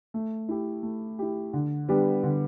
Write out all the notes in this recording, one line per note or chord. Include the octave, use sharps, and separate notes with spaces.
A3
E4 G4
A3
E4 G4
D3
G3 B3 D4 G4
D3